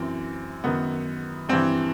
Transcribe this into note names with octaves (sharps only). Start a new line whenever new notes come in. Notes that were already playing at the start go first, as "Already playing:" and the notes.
Already playing: F#2 E3 C4
F#2 D#3 B3
G2 E3 C4